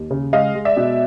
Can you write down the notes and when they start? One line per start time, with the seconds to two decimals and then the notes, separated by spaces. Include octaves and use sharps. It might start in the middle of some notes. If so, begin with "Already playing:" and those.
Already playing: D#2
0.11 C#3
0.33 G#3 D#5 F5
0.55 G#3
0.65 D5 E5
0.77 B2